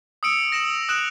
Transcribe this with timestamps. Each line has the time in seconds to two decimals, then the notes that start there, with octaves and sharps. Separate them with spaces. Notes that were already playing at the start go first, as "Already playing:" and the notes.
0.23 D#6 E6 C#7 D7
0.52 A#6 E7 F#7
0.65 D7
0.89 D#6 F#6 D7 E7 F#7